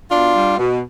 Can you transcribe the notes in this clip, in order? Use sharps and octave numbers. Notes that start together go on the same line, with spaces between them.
B2 D4 F4
G3
B2